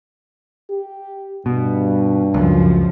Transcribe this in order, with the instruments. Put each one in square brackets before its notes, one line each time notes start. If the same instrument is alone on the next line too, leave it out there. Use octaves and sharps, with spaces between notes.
[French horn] G4
[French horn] G2 [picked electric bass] B2
[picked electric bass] C#2 [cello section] F#2 F3